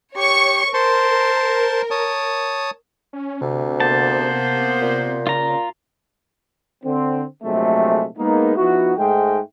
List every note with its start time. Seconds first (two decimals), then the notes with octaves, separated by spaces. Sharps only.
0.16 G4 C#5 C#6
0.74 A#4 C5 A5 C6
1.91 C#5 A5 D#6
3.13 C#4
3.41 D2 C3
3.80 A#3 B3 C5 A5
4.82 A#2
5.27 C#3 F4 A#5
6.84 D3 C4
7.43 A#1 C3 F#3 G#3 A3
8.18 G#3 A#3 B3 D#4
8.57 F3 B3 D#4 E4 F#4
8.98 G#2 G#3 A3 G5